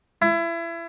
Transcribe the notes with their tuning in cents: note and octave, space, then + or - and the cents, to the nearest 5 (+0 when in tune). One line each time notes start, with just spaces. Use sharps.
E4 +30